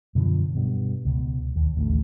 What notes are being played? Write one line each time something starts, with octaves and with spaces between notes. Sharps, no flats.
F#2 B2 D3 F3
G2 B2
C#2 B2
D#2
A1 D2 A3